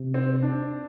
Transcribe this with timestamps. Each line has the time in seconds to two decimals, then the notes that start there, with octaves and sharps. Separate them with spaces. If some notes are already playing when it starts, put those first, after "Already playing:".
Already playing: C3
0.14 C4
0.43 D4